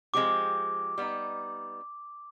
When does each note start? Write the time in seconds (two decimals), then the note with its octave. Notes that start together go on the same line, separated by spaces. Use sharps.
0.14 F3 G#3 C4 G4 D6
0.98 G3 B3 D#4